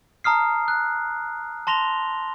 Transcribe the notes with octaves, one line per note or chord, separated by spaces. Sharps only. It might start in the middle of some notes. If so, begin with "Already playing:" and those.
A5 A#5 D#6 F6 C7
F#6
A5 C6 A#6 F7 G7